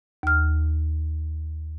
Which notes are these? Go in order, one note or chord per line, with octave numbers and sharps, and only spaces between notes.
D#2 F6